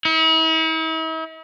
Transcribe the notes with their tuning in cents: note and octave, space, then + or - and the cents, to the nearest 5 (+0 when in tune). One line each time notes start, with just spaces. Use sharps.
E4 -45